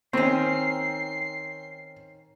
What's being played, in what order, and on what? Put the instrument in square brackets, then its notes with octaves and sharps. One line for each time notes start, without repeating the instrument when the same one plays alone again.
[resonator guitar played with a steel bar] D#3 C#4 [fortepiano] C4 [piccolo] C7